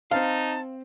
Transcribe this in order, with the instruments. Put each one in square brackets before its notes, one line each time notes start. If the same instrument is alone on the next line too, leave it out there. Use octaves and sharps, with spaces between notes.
[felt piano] C4 C5 [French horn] D#4 [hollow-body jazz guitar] F5 [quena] A5